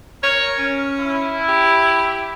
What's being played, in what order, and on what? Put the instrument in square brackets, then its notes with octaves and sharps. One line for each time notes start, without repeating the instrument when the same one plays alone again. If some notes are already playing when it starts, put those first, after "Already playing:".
[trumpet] A#4 [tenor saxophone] C#5
[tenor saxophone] C#4
[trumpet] E4
[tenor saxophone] G4